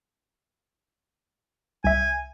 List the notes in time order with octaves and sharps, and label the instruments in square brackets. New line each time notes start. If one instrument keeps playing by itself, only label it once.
[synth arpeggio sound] C2 E5 [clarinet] G#5